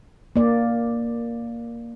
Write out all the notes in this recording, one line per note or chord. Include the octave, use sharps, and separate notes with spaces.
A#3 D5